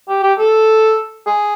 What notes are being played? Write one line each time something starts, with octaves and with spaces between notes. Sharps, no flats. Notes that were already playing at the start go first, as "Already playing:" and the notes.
G4
G4
A4
G#4